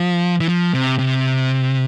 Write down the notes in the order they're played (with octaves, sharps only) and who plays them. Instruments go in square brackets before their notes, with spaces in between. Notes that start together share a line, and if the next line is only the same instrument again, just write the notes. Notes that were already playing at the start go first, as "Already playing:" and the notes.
Already playing: [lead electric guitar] F3
E3
F3
C3
C3